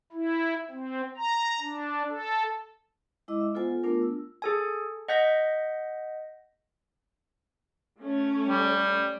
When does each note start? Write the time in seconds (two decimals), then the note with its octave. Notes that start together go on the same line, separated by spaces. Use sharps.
0.13 E4
0.71 C4
1.17 A#5
1.61 D4
2.09 A4
3.28 G#3 E4 D#5 D6 E6
3.41 E5
3.54 B3 F4 A4 C5 F#5 G#5
3.68 F4
3.83 A3 B3 D4 F4 A#4
4.02 E6
4.42 G#4 A4 G#5
5.08 D#5 F#5 G6 A#6 B6
7.98 A3 C#4
8.49 G3